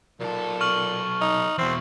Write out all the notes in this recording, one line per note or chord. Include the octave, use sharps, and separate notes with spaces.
B1 A#2 A4
C#6 F6 F#7
D#4
E2 B2 C4